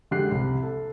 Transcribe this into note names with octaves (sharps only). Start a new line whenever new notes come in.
D3 G#3 G4 F#6 C7
C2
A4